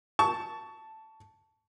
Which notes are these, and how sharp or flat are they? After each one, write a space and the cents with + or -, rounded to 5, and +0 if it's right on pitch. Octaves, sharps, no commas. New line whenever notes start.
A5 +0 C#6 +20